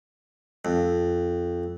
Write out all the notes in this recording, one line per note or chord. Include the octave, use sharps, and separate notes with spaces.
F2